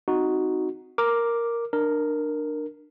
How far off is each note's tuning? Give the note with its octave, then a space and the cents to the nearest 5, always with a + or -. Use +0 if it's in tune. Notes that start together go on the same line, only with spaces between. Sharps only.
C4 -15 D#4 +0 F#4 +0
A#4 +0 D6 +0
D4 +25 A#4 +0